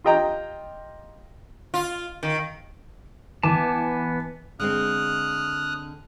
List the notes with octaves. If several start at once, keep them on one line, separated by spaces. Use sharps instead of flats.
F4 G4 D#5 G5 A#5
F4
D#3
E3 B3 G#5 A5 D6
D3 G#3 C4 D#6 F6 F#6